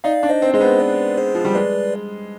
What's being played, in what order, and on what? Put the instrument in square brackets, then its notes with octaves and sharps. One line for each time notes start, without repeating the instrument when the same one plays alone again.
[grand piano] D#4 [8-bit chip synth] D5 F5
[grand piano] D4
[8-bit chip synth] C5 D#5
[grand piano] C4
[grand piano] G#3 [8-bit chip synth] C5 D#5
[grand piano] B3
[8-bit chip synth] B4 D5
G#4 C5
[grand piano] F3
G3
[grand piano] G#3 [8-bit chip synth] B4 D5